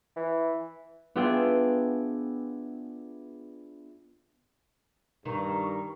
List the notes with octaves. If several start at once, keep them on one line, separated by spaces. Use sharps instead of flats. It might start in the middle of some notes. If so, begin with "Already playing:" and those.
E3
B3 D4 F4 G#4 E5 G5
G2 D#3 A#5 C#6